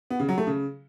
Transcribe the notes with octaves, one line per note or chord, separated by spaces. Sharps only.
B3
C#3
F#3
A3
C#3